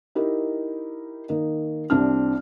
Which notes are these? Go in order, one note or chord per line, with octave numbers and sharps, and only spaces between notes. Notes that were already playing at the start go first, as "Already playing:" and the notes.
D#4 E4 G4 A#4
D#3 A#3 D#4
C2 C4 D4 F6